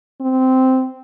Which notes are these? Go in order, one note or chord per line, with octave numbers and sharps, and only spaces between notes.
C4